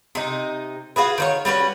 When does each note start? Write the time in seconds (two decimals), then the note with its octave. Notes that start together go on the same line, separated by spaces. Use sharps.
0.15 C3 D#4
0.96 F4 F#4 G#4 B4
1.18 D#3 B4 C#5
1.45 G3 C#4 F#4 B4